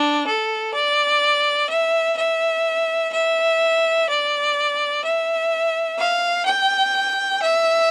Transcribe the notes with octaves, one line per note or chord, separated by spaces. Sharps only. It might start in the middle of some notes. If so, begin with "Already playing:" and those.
Already playing: D4
A4
D5
E5
E5
E5
D5
E5
F5
G5
E5